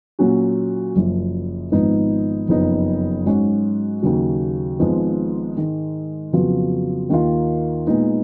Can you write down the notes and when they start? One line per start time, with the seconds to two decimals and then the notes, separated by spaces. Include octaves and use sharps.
0.19 A#2 F#3 C#4 F#4
0.96 F#1 F#2 F3
1.72 G#1 G#2 F3 B3 D#4
2.48 F#1 F2 F3 B3 D#4
3.26 G#2 F#3 C#4 F#4
4.03 D#2 C#3 F#3
4.79 G#1 G#2 F3 G#3 B3
5.56 G#2 D#3 G#3
6.33 F2 C#3 F#3 B3 F4
7.09 D#2 D#3 A#3 F4
7.87 A#2 G#3 B3 D#4